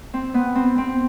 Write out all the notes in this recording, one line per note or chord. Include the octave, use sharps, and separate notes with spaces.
C4
B3
C4
C4